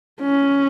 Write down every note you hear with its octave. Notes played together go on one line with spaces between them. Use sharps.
C#4